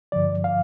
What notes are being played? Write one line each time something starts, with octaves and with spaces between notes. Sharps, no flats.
G2 D3 F3 D5
F5